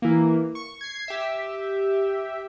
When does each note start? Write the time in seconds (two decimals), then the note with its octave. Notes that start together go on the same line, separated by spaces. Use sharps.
0.02 E3 A#3
0.55 C#6
0.81 G#6 C7
1.08 G4 E5